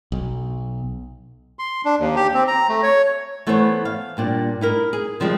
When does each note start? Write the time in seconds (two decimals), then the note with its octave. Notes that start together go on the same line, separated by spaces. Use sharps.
0.12 B1
1.59 C6
1.85 D4
1.99 D#2
2.16 G4
2.34 C4
2.48 A#5
2.69 A3
2.83 C#5
3.47 E3 A3 B3 E4 C5 C#5
3.85 F5
4.17 G2 A#2 D4
4.61 D#4 E4 A#4
4.93 G#4
5.20 C#3 F3 G3 G#3